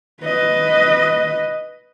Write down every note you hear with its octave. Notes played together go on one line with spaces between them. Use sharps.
B4 D#5